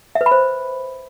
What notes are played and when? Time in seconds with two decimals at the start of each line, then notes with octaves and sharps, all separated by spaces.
0.15 E5
0.21 B4
0.26 B5
0.31 C5